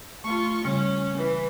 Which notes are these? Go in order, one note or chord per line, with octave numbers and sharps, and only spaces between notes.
A3 F4 C#6
C#3 G3 C#4
E3